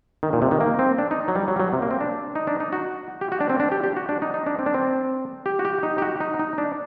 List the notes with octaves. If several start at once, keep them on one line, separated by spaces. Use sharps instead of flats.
D#3
A#2
C3
D#3
A#3
C4
D4
D#4
F#3
G3
F#3
G3
F#3
C3
A#3
C4
D4
D#4
D4
D#4
F#4
G4
F#4
D4
C4
D4
G4
G4
F#4
D4
D#4
D#4
D4
C4
D4
C4
G4
F#4
G4
D#4
G4
F#4
D#4
D#4
D4